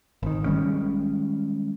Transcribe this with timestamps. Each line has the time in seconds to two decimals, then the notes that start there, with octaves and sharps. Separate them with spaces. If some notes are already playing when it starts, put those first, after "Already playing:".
0.23 G#1 D#3
0.46 D#3 G3 G#3 C#4